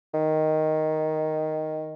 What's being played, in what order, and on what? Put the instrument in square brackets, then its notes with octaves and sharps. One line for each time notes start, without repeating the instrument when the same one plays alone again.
[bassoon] D#3